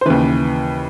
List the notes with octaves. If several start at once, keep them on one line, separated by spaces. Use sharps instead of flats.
C5
D#2 C#3 E3 B4